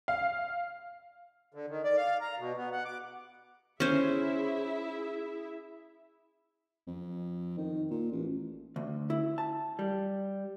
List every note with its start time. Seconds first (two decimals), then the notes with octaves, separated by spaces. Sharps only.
0.08 F5
1.54 D3
1.70 D#3
1.84 D5
1.97 F5
2.21 A#5
2.39 B2
2.57 B3
2.72 F#5
2.85 D6
3.80 C#4 E4 G#4 C5 E5
6.87 F2
7.57 D#3
7.90 A#2
8.11 A1
8.76 D2
9.10 E4
9.38 A5
9.79 G3